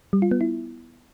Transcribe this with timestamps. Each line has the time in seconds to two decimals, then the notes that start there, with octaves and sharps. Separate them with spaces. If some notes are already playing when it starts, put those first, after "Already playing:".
0.13 G3
0.22 F4
0.31 B3
0.41 E4